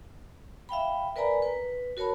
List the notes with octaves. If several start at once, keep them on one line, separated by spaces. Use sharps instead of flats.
E5 F5 G5 B5
A#4 B4 D5 G#5 A#5 B5
B4
F#4 A#4 C#5 A5 B5